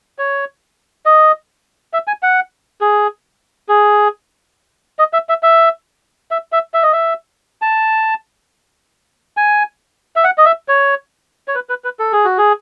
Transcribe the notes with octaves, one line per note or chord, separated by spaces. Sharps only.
C#5
D#5
E5
G#5
F#5
G#4
G#4
D#5
E5
E5
E5
E5
E5
E5
D#5
E5
A5
G#5
E5
F#5
D#5
E5
C#5
C#5
B4
B4
B4
A4
G#4
F#4
G#4